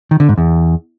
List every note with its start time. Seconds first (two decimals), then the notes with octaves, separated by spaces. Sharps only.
0.11 D#3
0.20 D3
0.29 G#2
0.38 E2